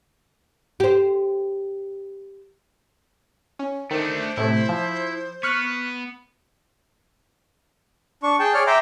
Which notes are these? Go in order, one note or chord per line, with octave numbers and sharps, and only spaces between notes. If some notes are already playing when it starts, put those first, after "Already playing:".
G4 C5
C#4
D#3 A3 D4 C5
A2 C3 A3 E4
F3
B3 C#6 F6 F#6
D4 C#6
G#4 G5 A5
G#4 C#5 D5 F6
E5 G5 A#5 C6 D6